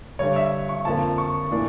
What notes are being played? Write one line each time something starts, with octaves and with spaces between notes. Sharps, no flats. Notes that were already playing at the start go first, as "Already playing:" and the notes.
G2 D3 G3 D4 C#5
E5
C#6
F2 D3 F3 A#3 A5
C#6
A2 E3 A#3 D4